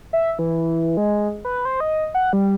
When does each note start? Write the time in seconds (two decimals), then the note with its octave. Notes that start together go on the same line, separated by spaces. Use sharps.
0.13 E5
0.39 E3
0.97 G#3
1.45 B4
1.65 C5
1.80 D#5
2.15 F#5
2.33 G3